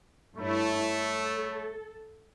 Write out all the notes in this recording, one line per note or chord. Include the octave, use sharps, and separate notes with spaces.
G2 A3 E4 C#5 B5 C#6
A4